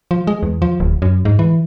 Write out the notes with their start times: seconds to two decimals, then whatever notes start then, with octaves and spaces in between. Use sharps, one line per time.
0.11 F3
0.27 G#3
0.43 E2
0.62 F3
0.80 D1
1.02 F#2
1.25 G#2
1.39 E3